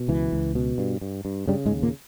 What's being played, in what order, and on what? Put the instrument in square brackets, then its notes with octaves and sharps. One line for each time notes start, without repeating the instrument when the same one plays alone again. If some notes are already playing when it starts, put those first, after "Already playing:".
Already playing: [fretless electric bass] B2
C#2 E3
C#2
B2
G2
G2
G2
G2 C#3 G3
G#2 G#3
D#2
A#2 A#3